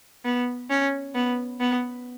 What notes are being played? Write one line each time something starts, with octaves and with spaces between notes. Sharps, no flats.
B3
C#4
B3
B3